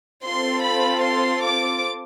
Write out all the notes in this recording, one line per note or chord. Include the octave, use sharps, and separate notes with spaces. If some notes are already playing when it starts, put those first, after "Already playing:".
C4 F4 A4 C6
B5
C6
D6